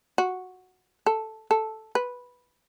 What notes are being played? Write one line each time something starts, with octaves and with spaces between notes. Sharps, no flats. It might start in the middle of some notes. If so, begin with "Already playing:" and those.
F#4
A4
A4
B4